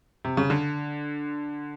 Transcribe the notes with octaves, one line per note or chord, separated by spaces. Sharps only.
C3
C#3
D3